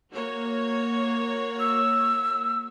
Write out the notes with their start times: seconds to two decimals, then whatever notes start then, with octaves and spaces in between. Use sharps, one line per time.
0.12 A#3 F#4 C#5
1.60 E6